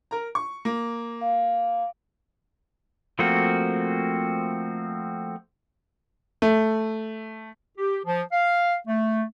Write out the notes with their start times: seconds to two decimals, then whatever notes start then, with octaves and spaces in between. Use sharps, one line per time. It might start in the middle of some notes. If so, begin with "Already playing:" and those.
0.11 A#4 A#5
0.35 C#6
0.65 A#3
1.21 F5
3.19 F3 A3 A#3 C4 F#4
6.42 A3
7.77 G4
8.05 F3
8.32 F5
8.87 A3